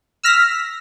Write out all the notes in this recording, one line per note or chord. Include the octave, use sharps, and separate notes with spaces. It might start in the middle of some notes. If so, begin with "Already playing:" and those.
E6 F6 A#6 B6